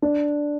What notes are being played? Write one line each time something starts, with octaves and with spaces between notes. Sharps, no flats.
D4